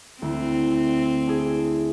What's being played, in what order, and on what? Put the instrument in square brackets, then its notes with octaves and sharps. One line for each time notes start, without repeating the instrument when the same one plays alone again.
[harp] D2 E4 [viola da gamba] C4
[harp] D4 E4 G#4